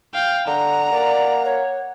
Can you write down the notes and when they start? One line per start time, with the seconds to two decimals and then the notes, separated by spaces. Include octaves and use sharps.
0.14 F5 G5
0.47 D3 F#5 A#5
0.92 A#3 D5
1.45 C#5